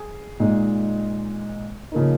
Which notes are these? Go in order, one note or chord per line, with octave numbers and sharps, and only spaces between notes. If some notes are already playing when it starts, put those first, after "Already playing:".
Already playing: G#4
A#2 G#3 D#4
C#3 F3 A#3 D#4